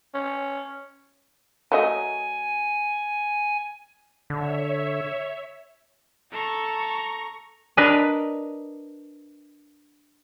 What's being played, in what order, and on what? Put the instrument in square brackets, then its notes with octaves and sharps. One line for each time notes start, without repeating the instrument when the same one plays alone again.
[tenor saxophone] C#4
[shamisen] F#3 A3 D#5 [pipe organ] G#5
[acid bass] D3 [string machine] C#5 E5
[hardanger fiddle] A4 [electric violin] A#5 C#6
[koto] D4 A#4 B4 D#5